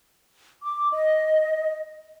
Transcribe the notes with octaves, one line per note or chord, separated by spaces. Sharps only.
D6
D#5